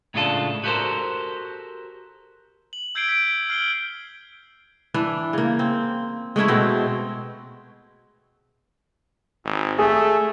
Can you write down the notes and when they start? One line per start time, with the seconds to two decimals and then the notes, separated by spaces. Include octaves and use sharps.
0.14 A2 C#3 G#3 D4 F4 A4
0.64 F#4 G4 A4 A#4 C5
2.73 F#7
2.95 E6 G6 G#6 C7 D7 G7
3.09 B6 D7
3.30 G7
3.50 F6 C7 F#7 G7
4.94 E3 D4
5.33 C#3 A#3
5.59 C4
6.36 G#3 A3 C#4 E4
6.48 B2 C4
9.45 G#1
9.79 A3 G#4